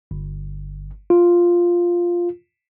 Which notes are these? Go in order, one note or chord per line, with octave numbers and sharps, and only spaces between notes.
G1
F4